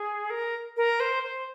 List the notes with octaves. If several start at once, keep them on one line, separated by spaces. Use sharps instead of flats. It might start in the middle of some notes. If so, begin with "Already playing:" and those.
Already playing: G#4
A#4
A#4
C5
C5